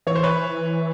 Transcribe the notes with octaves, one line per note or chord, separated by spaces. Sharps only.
E3 C#5
C5
B4 C#5